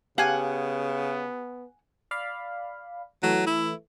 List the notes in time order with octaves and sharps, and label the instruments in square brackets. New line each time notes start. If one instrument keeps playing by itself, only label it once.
[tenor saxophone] C#3 [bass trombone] B3 [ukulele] G4 F5 [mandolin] F#5 G#5
[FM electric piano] D5 F5 B5
[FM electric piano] E3 A3 [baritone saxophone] F#3
[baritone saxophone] E4